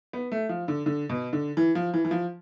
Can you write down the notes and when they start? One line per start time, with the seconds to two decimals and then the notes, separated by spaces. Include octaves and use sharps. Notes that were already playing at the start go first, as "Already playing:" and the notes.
0.13 B3
0.32 A3
0.49 F3
0.68 D3
0.86 D3
1.10 B2
1.33 D3
1.57 E3
1.75 F3
1.94 E3
2.05 E3
2.11 F3